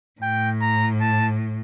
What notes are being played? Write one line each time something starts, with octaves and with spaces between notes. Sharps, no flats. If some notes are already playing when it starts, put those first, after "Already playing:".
A2 G5
A#5
A5